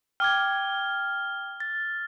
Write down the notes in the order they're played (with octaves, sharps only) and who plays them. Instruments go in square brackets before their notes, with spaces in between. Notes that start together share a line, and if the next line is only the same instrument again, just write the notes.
[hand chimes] G5 D6 G#6 [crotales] F6
[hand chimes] A6